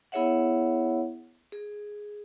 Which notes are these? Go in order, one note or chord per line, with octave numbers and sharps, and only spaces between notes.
B3 E4 G#4 C#5 E5 F#5
G#4